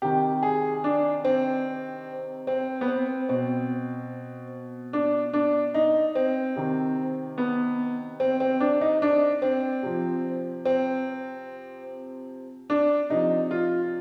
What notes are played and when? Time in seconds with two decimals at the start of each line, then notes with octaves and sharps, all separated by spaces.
0.02 C3 D#3 G4
0.43 G#4
0.84 D4
1.25 C4
2.47 C4
2.81 B3
2.88 C4
3.29 B2 C4
4.93 D4
5.33 D4
5.74 D#4
6.15 C4
6.56 C3 D#3
7.38 B3
8.20 C4
8.40 C4
8.60 D4
8.81 D#4
9.02 D4
9.42 C4
9.83 C3 F3
10.65 C4
12.70 D4
13.10 C3 F3 D#4
13.51 F4